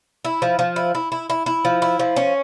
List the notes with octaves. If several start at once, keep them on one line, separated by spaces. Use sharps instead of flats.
E4
F3
F3
E4
E4
E4
E4
E4
F3
E4
F3
C#4